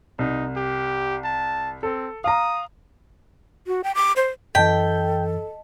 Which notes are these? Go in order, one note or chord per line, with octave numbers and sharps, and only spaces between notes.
C2 D#4
G4
A5
C4 A4
F5 A#5 D#6
F#4
G5
D6
C5
F#2 E3 A4 D#5 G5 A5 B6